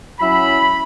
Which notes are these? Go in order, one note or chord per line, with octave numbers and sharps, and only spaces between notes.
F#3 C#4 E4 B5